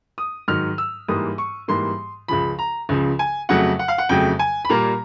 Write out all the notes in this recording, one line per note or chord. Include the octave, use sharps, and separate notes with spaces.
D#6
G#2 D#3 F#3 F6
E6
G#2 E3 G3 A#3 D#6
C#6
G#2 E3 G3 A#3 C6
C#2 C#3 F3 B5
A#5
C#2 C#3 F3
G#5
F2 C#3 F#3 A3 F#5
F#5
F5
F#5
F2 C#3 F#3 A3 G5
G#5
B5
A#2 G3 A#3 A#5